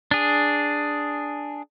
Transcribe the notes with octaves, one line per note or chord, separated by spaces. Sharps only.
D4 G#4